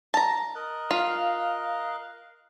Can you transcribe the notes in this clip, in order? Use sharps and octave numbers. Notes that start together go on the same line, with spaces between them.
A5 A#5
A#4 D#5 F#6
F4 F5